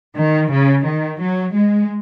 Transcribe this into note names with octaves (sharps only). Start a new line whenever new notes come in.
D#3
C#3
D#3
F#3
G#3